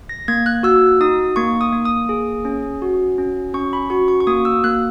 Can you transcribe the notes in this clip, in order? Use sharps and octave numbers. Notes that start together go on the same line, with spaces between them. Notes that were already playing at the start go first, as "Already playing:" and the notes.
A#6
A#3 G#6
F#6
F#4 E6
D#4 D#6
A#3 C#6
D#6
A#3
D#6
G#4
C#4
F#4
C#4
C#4 C#6
B5
F#4 C#6
C#6
C#6
A#3 D#6
E6
A#3 F#6